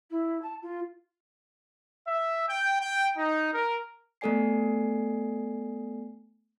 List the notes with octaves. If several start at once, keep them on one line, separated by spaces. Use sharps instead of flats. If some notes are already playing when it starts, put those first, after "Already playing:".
E4
A5
F4
E5
G5
G5
D#4
A#4
A3 B3 A4 D5 G#5 C7